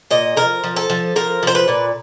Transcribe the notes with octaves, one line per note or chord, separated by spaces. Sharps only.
A#2 D#5
F3 A#4
F3
A4
F3
F3 A#4
F3 C5
B4
A#2